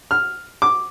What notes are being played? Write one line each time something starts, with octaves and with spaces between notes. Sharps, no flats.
F6
D6